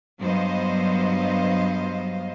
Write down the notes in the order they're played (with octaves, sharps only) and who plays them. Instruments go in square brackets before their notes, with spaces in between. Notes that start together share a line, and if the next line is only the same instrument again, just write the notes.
[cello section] G2 F#3 B3 C5 D#5 F5